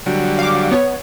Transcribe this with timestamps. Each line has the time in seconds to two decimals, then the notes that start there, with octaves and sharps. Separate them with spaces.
0.06 D3 F#3 G3
0.39 F5 D6
0.71 B3 C#5